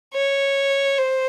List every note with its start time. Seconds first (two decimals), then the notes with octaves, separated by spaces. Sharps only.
0.14 C#5
0.98 C5